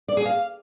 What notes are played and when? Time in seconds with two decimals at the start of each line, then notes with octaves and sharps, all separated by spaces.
0.08 D5
0.17 G#4
0.25 F5